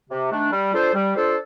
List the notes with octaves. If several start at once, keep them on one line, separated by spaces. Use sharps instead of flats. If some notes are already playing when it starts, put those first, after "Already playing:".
C3
D#3 A3 D4
G3
D4 F4 A4 C5
G3
D4 F4 A4 C5